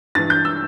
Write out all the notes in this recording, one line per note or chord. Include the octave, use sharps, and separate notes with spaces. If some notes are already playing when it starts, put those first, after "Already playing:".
G2 E3 A6
G6
E6